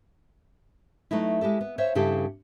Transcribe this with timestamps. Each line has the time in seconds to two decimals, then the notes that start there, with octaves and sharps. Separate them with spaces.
1.11 F#3 A3 B3 D#4 E4
1.41 G#3 E4 G4 A4
1.61 B3
1.78 C5 C#5 E5 F5
1.95 G2 C#3 E4 G4 A4